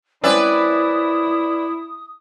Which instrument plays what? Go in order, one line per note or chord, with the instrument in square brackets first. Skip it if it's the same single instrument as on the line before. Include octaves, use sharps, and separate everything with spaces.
[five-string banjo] G#3 C4 C#4 [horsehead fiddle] E4 [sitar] B4 D5 E5 [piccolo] D#6